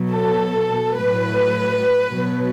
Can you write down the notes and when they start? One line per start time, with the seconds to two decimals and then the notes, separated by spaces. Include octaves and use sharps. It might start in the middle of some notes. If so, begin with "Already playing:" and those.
Already playing: B2 F#3
0.11 A4
0.96 A2 F#3 B4
2.11 B2 F#3